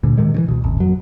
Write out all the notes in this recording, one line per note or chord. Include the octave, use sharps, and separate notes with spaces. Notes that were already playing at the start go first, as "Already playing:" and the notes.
D2 A#2 D3
A2 C3 D#3 G#3
C#3 E3
C2 B2
D#1 G#1
F2 F#3